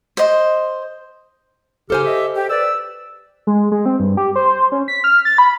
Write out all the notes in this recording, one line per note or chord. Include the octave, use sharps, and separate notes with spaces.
C5 D#5
C#3 D#4 G4 A4 C5 G#5 F6
D#5 E5
G4
B4 D5 E6
G#3
G#3
C4
G2
G4
C5
C#4
B6
F6
A6
B5